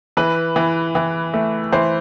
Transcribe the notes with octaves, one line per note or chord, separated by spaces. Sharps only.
E3 B4
E3
E3
A3
E3 C5